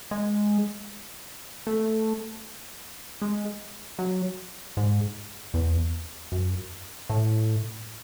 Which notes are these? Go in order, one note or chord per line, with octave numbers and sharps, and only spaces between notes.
G#3
A3
G#3
F#3
G#2
E2
F#2
A2